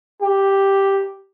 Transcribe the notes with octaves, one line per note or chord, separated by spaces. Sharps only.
G4